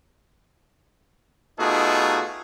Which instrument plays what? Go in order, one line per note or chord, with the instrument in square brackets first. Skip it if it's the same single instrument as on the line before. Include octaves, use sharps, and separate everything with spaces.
[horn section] B2 A3 D#4 F4 F#4 G#4